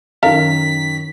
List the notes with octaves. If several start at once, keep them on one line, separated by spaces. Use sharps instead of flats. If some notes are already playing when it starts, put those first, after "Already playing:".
F#2 D#3 A4 A#4 F5 B6